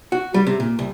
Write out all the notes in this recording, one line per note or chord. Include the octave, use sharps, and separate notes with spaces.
F#4
G3
C3
A#2
C2